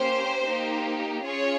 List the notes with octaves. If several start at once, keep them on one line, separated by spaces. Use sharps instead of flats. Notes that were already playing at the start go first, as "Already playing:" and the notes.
Already playing: A#3 C#4 G4 C5
A#3 D#4 G4
C#4 F4 G#4 C#5